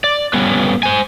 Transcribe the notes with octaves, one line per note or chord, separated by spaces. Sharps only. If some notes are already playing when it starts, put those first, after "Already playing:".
D5
G3 B3 C#4 B4
C5 G#5